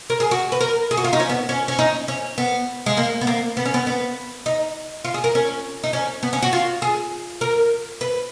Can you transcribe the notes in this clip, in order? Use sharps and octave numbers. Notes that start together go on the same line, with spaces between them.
A#4
G#4
F#4
B4
A#4
G#4
F#4
F4
D#4
C#4
B3
C#4
C#4
D#4
C#4
B3
G#3
A#3
B3
A#3
B3
C#4
B3
B3
D#4
F4
G#4
A#4
C#4
D#4
C#4
B3
C#4
F#4
F4
G#4
A#4
B4